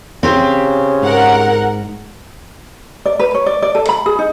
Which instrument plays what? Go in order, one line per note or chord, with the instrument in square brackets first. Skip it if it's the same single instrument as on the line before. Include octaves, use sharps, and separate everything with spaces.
[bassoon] C#3 [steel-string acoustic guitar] C4 G4 G#4
[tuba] G#2 [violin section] A#4 F#5
[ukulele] D5
B4
C#5
D5
D5
A4
B5
G#4
D#4